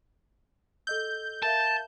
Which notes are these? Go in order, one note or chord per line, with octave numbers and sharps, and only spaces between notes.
A4 D#5 E6 G6
A#4 E5 F5 A5 A6